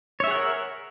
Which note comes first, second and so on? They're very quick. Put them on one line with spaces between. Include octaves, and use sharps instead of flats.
C#5 E5 G#4 F#5 A#4